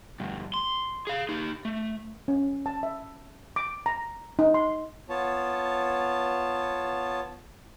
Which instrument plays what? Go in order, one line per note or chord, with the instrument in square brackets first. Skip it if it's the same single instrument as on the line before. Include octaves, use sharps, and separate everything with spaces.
[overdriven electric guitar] D2 G2
C6
G#4 F5
D#4 G4
A3
[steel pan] C#4
A5
E5
D6
A#5
D#4
C6
[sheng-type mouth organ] B3 F4 C#5 A5